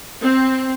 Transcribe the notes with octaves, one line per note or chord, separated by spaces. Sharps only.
C4